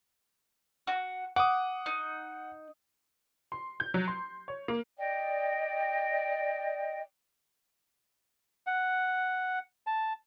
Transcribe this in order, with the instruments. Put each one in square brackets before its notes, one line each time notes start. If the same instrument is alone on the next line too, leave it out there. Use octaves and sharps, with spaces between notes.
[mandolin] F#4
[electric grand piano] F#5 D#6 [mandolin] D6
[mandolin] D#4
[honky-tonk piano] C6
G6
F#3
C6
C#5
A#3
[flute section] D5 D#5 G5
[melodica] F#5
A5